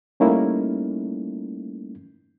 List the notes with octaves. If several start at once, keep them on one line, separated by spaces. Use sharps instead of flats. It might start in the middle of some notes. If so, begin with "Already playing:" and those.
G3 A3 A#3 C#4 D#4 E4